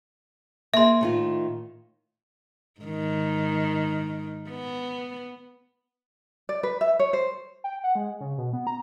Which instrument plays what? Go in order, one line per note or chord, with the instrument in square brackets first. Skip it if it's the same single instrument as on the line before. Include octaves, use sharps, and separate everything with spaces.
[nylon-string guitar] A#3 G#4 [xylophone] E5 C6
[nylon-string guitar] A2 D#3 F4
[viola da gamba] G#2 D#3
B3
[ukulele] D5
B4
E5
C#5
C5
[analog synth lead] G5
F#5
G#3
C#3
B2
B3
A#5